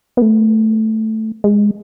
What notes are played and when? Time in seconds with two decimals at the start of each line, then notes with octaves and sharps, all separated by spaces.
0.17 B3
0.22 A3
1.44 G#3